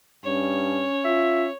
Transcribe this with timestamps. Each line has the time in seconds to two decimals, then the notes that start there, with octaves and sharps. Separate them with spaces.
0.24 G2 C#4 C#5
1.05 F4 E5